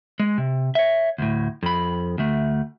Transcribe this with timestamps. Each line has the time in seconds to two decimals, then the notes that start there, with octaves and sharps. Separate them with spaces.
0.20 G#3
0.38 C3
0.75 C#5 E5
1.18 D2 A2
1.63 F2 B5
2.18 D2 A3